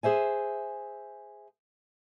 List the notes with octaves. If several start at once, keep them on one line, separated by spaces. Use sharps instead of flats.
G#4 C5 E5 G#5